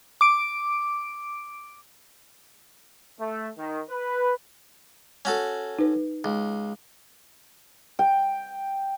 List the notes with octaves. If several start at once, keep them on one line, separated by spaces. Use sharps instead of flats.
D6 D7
A3
D#3
B4
C#4 F#4 A4
D#4 B4
C#2
G5